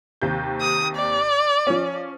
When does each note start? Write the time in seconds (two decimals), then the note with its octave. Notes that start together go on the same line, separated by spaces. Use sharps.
0.22 D#2 C3 G6
0.60 D#6
0.96 D5
1.67 F3 C#4